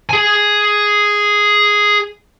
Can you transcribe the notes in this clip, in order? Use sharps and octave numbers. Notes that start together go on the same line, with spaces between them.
G#4 G#5